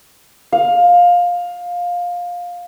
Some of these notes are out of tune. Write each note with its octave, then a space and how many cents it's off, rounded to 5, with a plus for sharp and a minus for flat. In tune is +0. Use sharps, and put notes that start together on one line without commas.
F5 +15